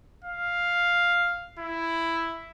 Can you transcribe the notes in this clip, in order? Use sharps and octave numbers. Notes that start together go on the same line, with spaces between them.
F5
E4